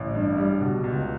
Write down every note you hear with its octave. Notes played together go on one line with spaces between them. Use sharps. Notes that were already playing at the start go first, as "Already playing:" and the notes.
Already playing: A1
G2
G3
B2
C#2